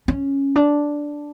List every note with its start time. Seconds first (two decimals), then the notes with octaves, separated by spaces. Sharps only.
0.08 C#4
0.56 D4